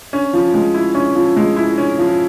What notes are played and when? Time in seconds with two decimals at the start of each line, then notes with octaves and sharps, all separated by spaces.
0.13 C#4
0.33 F3
0.54 G#3
0.74 E4
0.95 C#4
1.15 F3
1.36 G#3
1.56 E4
1.78 C#4
1.98 F3